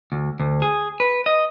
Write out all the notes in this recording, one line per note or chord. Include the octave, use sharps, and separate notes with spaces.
D2
D2
G#4
B4
D#5